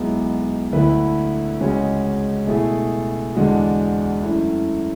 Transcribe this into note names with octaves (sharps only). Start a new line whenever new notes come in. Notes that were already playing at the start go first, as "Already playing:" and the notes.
Already playing: B1 B2 G#3 B3 E4
D2 D3 A3 E4 B4
C#2 C#3 G#3 C#4 F#4
B2 A3 E4 G#4
E2 D3 G#3 D4 F#4
F#2 E3 A3 E4